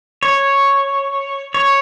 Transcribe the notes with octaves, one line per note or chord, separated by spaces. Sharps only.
C#5
C#5